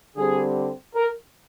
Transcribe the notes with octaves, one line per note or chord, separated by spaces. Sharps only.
D3 G3 C4 G#4
A#4